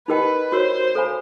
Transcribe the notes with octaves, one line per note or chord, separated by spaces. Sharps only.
D#4 G4 A#4 B4 D#5 G5
F#4 A#4 C5 C#5
A4 C5 F5 G#5 B5